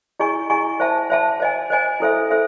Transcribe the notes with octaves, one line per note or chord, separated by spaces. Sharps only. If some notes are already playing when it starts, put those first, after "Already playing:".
E4 G#4 D#5 G#5 C#6
E4 G#4 D#5 G#5 C#6
C5 E5 A5
C5 E5 A5
C5 D#5 G#5
C5 D#5 G#5
E4 A4 C5 E5
A4 C5 E5